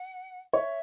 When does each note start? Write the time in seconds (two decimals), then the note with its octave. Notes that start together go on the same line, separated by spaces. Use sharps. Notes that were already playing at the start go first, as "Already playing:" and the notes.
Already playing: F#5
0.53 C#5 E5